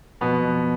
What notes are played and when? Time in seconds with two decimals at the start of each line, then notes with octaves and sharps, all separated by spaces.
0.21 F2 B2 B3
0.44 F2